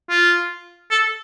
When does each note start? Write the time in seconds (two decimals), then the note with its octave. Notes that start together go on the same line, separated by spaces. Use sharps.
0.09 F4
0.91 A4